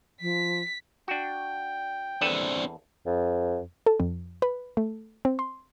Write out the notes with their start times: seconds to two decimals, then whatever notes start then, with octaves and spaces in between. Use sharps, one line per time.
0.21 F3 B6
1.08 D4 F#4 G5
2.21 E2 C4 D4 A4 B4
3.06 F2
3.86 A4
4.00 F2
4.42 B4
4.77 A3
5.25 C4
5.39 C6